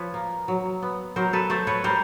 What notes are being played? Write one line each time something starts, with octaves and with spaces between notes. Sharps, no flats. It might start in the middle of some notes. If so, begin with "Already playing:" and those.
Already playing: F3 F4 B4 C#5
A#3
F#3
B3
F#3 A#4 C5
A4 B4
A3 C5 D5
B4 C#5
G3 A#4 C5